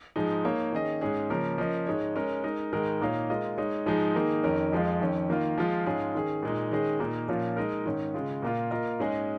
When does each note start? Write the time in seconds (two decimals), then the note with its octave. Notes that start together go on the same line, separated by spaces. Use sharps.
0.16 G#2 F3 G#3 D#4 G#4
0.45 A#3 D#4 C#5 F5
0.72 D#3 C#4 G#4 D#5
1.01 G#2 G#3 C#4 G#4
1.30 C#3 F3 A#3 C#4 A#4
1.58 F3 C#4 A#4 D#5
1.86 G#2 G#3 D#4 C#5
2.16 G#3 C#4 A#4
2.44 G#3 D#4 A#4
2.72 G#2 D#3 G#3 D#4 A#4
3.01 A#2 A#3 D#4 C#5 F5
3.30 G#3 F4 A#4 D#5
3.58 G#3 D#4 C#5
3.86 G#2 F3 G#3 D#4 G#4
4.15 D#3 A#3 D#4 G#4
4.43 F2 D#3 C#4 A#4
4.72 F2 F3 G#3 F4
5.01 F2 D#3 C#4
5.30 D#3 A#3 F4
5.58 F3 G#3 F4
5.86 G#2 G#3 C#4 F4 G#4
6.15 D#3 C#4 G#4
6.43 A#2 G#3 D#4
6.71 D#3 G#3 C#4 G#4 D#5
7.00 A#2 A#3 D#4
7.29 A#2 F3 A#3 C#4 F4
7.57 G#3 D#4 A#4
7.86 G#2 D#3 C#4
8.14 C#3 G#3 F4
8.42 A#2 A#3 F4
8.71 A#3 F4 A#4 D#5
8.99 G#2 G#3 C#4 G#4 D#5